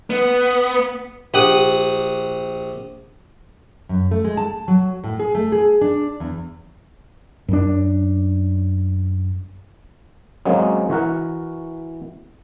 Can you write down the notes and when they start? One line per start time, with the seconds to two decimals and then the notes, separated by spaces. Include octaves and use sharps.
0.10 B3
1.34 A#1 G4 F#5 D#6
3.89 F#2
4.11 A3
4.25 G#3
4.37 A5
4.68 F#3
5.04 A2
5.19 G#4
5.35 A3
5.52 G#4
5.82 D4
6.20 E2
7.48 F#2 D4
10.45 F#3 G#3 A#3 C4 C#4
10.89 E3 F#4 A#4 F#5